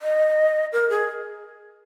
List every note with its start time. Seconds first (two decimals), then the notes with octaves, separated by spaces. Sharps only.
0.02 D#5
0.72 A#4
0.90 G#4